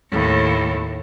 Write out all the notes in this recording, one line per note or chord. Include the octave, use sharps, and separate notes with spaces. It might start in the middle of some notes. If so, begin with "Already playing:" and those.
D#2 A2